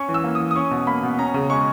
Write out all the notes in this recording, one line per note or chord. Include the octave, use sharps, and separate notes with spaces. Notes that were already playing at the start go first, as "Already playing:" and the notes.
Already playing: C#4 C#6
E3
E6
A#3
D#6
E3
D#6
C#4 C#6
B2
A#3 B5
B2
C#4 A#5
C#3
G#3 C#6